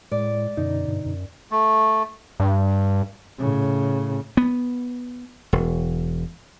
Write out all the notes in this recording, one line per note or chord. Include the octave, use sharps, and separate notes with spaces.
A2 G#3 D5
F#2 B2 D3 D#4
G2
F#2
A3
G2
A2 C#3
B3
E1